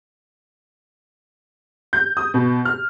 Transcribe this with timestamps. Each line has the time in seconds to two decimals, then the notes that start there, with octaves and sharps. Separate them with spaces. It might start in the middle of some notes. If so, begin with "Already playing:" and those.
1.93 G6
2.17 D#6
2.34 B2
2.65 F6